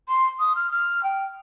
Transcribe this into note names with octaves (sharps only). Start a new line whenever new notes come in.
C6
D#6
F6
F6
G5